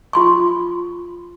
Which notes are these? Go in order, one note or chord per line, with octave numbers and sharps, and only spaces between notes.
F4 C6 C#6